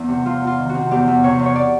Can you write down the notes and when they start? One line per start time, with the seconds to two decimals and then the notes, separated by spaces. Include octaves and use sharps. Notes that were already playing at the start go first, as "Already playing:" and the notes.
Already playing: E2
0.09 C3
0.26 E2 F4
0.41 E2
0.47 F4
0.58 D#3
0.69 F#4
0.75 C3
0.91 E2 G4
1.08 E2
1.24 C3 C#5
1.39 E2
1.46 C#5
1.56 D5